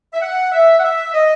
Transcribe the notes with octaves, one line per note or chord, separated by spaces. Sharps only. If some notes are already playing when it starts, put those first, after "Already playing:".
E5
F#5
E5
F#5
E5
D#5